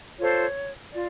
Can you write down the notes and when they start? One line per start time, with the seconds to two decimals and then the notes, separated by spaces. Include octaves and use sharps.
0.19 F4 A4 C5 C#5
0.93 F4 D5